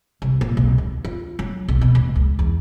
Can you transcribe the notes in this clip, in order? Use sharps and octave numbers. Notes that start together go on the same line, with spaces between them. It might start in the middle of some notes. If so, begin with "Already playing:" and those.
C2
A#2
B1
D#2
F4
F#3
B1
B2
D#1
C#2
E2